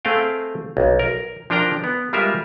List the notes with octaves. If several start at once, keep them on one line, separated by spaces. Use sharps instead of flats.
A3 C4 G#4 F5 G5
B1
A#4
F3 D4 A#4 G5 A#5
B3
G3 G#3 F4 A#4 E5